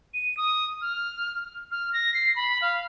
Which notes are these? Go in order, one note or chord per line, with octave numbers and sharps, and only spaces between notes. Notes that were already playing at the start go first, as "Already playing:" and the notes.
D#7
D#6
F6
F6
A#6
C7
B5
F5